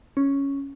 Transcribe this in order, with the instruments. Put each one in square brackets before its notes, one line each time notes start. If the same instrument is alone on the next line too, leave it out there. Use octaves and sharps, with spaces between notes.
[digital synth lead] C#4